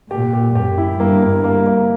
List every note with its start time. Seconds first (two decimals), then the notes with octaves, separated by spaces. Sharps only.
0.11 A#2 G4
0.33 G4
0.55 F#2 G4
0.78 E4
0.99 G2 A#3
1.22 A#3
1.30 G2
1.44 A#3
1.66 A#3